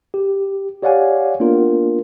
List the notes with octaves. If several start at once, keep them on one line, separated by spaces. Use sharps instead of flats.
G4
G4 C#5 D5 F5 F#5 G#5
A#3 B3 D4 F4 A#4